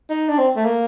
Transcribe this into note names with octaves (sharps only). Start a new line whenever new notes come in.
D#4
D4
C4
A3
A#3